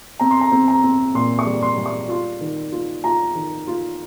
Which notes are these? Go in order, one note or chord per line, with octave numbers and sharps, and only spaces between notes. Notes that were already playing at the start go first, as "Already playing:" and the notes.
C4 A#5
C6
A#5
C4
A#5
C4
A#2 C6
C#6
G3
C6
G3
C#6
F4 C6
D#3
F4
F4 A#5
D#3
F4